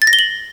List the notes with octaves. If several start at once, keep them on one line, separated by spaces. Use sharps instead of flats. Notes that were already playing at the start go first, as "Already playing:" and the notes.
A6
A#6
G7
F#7